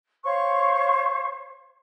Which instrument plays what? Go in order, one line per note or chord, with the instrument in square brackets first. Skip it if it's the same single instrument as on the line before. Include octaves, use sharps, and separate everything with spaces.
[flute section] C5 C#5 F5 C#6